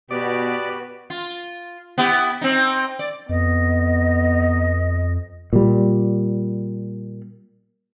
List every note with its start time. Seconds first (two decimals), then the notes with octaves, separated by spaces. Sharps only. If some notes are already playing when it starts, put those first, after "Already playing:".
0.11 B2 B3 F#4 G4 B4 D5
1.10 F4
1.98 B3 E4 G4
2.41 C4 D#4
2.99 D5
3.29 F2 B3 D#5
5.53 A#2 G3